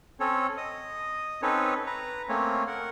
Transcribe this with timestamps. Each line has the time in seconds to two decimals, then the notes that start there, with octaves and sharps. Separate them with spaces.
0.20 C4 C#4 A4 C#5
0.57 D#5 D#6
1.42 C4 C#4 D#4 A4 B4 C#5
1.86 B4 A#5
2.29 A3 A#3 C4 C#4 C#5
2.67 A#4 F#5